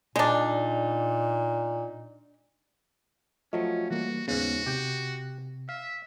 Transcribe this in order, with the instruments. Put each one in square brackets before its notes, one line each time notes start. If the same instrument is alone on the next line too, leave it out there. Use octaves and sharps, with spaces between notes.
[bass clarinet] A#2 [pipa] G#3 D4 [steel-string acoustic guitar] D#4
[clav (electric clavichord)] F3 F#3 A3 [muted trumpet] C#4 [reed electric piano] F4 D#5
[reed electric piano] E3 G3 A#3 [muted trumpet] F#4
[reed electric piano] D#2 B3 [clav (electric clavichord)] G#2 C#3 [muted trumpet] F#4
[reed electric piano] C3 [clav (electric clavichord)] G4 G5
[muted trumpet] E5 [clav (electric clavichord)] F5